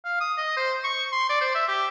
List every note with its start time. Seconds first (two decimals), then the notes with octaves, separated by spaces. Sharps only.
0.04 F5
0.20 D#6
0.37 D#5
0.57 C5
0.84 C#6
1.12 C6
1.29 D5
1.41 C5
1.55 E5
1.68 G4